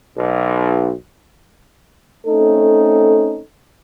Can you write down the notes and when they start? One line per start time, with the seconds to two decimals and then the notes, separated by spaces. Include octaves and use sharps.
0.16 B1
2.27 A3 C4 C#4 D#4 A4